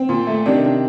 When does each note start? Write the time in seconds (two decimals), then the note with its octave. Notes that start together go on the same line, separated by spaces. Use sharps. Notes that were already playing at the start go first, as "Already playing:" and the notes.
Already playing: C4
0.09 A#2
0.27 A3
0.46 C3 D#3 D4
0.64 D4